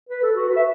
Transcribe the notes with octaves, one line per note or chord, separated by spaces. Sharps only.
B4
A4
F#4
B4
E5